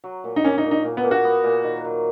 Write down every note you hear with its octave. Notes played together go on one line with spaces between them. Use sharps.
F#3
A#2
D#4
A#2 C#4
D#4
A#2
D#4
A#2
B3
A#2
F#4
B3
A#2
D#3
F#3